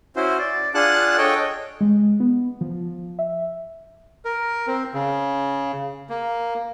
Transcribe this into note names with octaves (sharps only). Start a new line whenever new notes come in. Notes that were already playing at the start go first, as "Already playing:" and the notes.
C#4 E4 F#4 C5
D5
D4 F4 G#4 F#5 A5 F#6
A4 C#5 D#5 G5
G#3
B3
F3
E5
A#4
C4
C#3
A#3